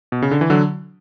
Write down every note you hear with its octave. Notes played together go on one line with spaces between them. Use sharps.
B2
C#3
D3
E3
D3 F#3